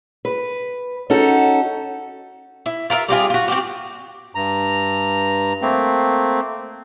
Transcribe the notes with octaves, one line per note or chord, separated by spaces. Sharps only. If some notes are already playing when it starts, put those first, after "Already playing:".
B4
C#4 D#4 F#4 A4
E4
F4 A#4 D5 E5
G3 C4 F4 G#4
F4 F#4
C4 F#4 G4
G2 A#5
A3 A#3 C4